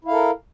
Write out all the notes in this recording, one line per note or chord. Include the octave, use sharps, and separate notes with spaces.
E4 A4 A#4 F5